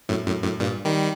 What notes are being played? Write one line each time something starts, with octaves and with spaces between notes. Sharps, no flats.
F#2 A2
F#2 A2
F#2 A2
G2 A#2
D#3 G3